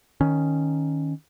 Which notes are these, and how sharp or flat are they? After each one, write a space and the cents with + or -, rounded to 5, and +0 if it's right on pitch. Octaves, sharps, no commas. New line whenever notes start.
D#3 +0 C#4 +0